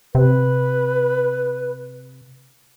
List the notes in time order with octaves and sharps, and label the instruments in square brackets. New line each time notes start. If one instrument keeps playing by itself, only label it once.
[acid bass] C3 [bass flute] B4